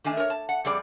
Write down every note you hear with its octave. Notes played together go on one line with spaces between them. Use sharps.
D#3 A3 D4 G#5
A#4 C#5
A5
F#5
F2 G3 G#4 D5